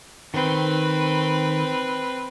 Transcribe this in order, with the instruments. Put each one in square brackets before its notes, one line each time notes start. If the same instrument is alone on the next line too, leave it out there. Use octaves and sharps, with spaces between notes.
[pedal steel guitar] D#3 [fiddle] C4 B4